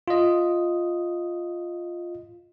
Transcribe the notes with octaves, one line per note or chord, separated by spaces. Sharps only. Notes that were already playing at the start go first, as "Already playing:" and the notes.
F4 D#5